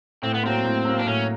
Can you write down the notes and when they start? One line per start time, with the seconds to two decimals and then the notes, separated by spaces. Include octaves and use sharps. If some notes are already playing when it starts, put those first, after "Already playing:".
0.22 A2 C4
0.34 B3
0.43 F#3 A#3 C4
0.65 A2
0.85 F#3 A#3
0.99 D4
1.06 A2 C#4